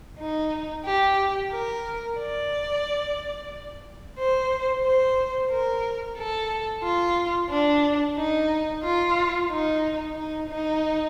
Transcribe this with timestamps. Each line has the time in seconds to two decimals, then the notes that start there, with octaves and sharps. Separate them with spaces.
0.19 D#4
0.85 G4
1.51 A#4
2.19 D5
4.18 C5
4.84 C5
5.50 A#4
6.17 A4
6.83 F4
7.50 D4
8.17 D#4
8.83 F4
9.50 D#4
10.16 D#4
10.49 D#4